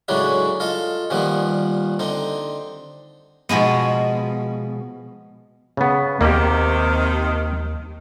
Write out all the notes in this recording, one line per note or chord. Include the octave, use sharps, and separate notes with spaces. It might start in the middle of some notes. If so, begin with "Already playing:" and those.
A2 C#3 F#3 G#3 D4 E4
F4 A4 D#5
A#2 D#3 F3 G3 B3
D3 C4 D#4
B2 F3 G#3 B3
C#3 B3
D#2 C3 D#3 A#3 G4